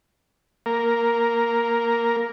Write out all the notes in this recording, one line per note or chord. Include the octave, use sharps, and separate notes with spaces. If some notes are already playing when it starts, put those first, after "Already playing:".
A#3 A#4